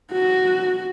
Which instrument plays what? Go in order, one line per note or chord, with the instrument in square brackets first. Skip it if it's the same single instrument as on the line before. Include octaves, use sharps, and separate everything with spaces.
[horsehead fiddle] F#4